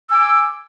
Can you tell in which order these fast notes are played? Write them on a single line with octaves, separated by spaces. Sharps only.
E6 G#5 D6